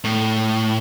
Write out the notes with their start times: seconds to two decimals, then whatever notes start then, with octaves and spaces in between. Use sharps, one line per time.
0.04 A2